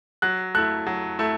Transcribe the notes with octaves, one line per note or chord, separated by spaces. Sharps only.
F#3 F#6
A3 E4 F#6
F#3
A3 E4